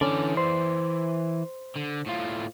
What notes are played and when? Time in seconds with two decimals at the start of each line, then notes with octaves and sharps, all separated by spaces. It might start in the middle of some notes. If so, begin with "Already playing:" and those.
0.01 D3 E3 C#4 D5
0.37 C5
1.76 D3
2.07 A2 F4